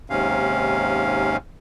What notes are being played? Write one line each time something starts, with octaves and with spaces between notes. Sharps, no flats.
D#2 G#2 C3 C#4 F5